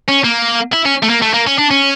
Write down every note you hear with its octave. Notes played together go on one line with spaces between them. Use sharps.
C#4
A#3
E4
C#4
A3
A#3
A3
A#3
C#4
D4
C#4